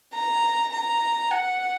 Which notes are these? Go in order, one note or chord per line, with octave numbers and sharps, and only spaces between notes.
A#5
A#5
F#5